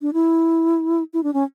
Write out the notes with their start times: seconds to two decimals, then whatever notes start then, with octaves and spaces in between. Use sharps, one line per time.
0.02 D4
0.13 E4
1.13 E4
1.23 D4
1.34 C#4